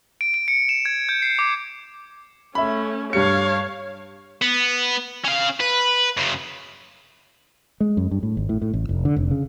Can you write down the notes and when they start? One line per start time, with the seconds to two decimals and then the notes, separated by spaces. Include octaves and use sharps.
0.21 D7
0.34 D7
0.48 C#7
0.69 E7
0.85 G#6
1.09 G6
1.22 C7
1.39 D6
2.55 A3 C#4 E5 B5
3.13 G2 G3 C#5 F5 C#7
4.42 B3
5.24 C#4 F5
5.60 B4
6.17 F#2 C#3
7.80 G#3
7.97 F#2
8.11 G2
8.23 A2
8.37 G#1
8.49 A2
8.62 A2
8.74 A1
8.89 F1
9.05 D3
9.16 F1
9.31 C#3